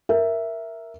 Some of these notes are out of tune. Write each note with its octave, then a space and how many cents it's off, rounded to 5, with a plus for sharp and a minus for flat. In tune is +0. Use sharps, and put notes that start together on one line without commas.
A#4 +0 E5 +0